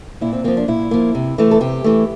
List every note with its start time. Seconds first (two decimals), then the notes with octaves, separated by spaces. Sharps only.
0.21 A#2 E4
0.33 C4
0.44 F3 A#3 C4
0.57 D4
0.68 A#2 E4
0.91 F3 A#3
1.15 C3
1.38 E3 A3
1.51 A4
1.61 C3 G4
1.84 E3 A3